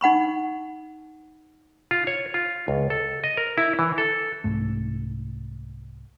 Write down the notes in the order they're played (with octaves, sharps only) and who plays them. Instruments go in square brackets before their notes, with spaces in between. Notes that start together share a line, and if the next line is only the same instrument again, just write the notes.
[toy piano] D#4 F#5 B5 C#6
[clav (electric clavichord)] F4
C#5
F4
C#2
A4
D#5
A#4
E4
E3
A4
[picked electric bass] C2 G#2 A3